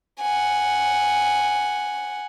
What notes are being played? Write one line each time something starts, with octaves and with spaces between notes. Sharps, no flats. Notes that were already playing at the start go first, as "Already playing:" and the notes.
F#5 G#5